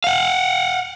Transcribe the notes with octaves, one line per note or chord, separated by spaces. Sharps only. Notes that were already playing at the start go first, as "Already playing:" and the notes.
F5 F#5